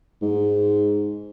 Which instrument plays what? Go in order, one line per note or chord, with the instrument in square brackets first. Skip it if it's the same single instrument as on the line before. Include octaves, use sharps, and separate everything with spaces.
[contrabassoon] G#2